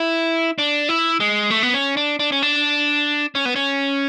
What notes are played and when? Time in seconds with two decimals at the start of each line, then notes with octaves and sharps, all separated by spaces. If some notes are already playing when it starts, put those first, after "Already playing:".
Already playing: E4
0.58 D4
0.89 E4
1.20 G#3
1.50 A3
1.63 B3
1.74 C#4
1.97 D4
2.19 D4
2.32 C#4
2.43 D4
3.35 C#4
3.45 B3
3.56 C#4